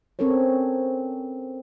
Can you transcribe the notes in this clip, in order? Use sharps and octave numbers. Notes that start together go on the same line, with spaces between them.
C4 C#4 A4 A#4 C#5